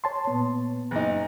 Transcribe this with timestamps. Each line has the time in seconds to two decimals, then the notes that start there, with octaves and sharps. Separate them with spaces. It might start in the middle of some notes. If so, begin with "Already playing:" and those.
0.04 C#5 A5 C6
0.27 A#2 B3
0.91 F#1 D#4